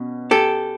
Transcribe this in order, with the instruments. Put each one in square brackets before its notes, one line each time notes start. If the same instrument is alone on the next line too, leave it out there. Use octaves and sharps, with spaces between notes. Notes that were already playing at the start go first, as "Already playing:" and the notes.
Already playing: [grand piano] B2 C#4
[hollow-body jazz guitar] G4 A4